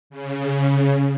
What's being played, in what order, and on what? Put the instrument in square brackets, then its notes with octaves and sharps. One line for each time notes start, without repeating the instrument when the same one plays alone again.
[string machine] C#3